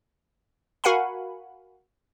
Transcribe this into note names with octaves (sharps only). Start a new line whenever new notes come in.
F#4 A#4 F5 F#5 G#5 B5